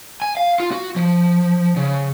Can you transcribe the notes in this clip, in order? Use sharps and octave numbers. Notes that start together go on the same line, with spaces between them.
G#5
F5
F4
F#4
F3
C#3